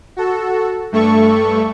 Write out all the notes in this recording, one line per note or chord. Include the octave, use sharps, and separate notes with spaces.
F#4 A4
G2 A3 A4 C#6